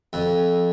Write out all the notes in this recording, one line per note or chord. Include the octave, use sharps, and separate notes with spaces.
F2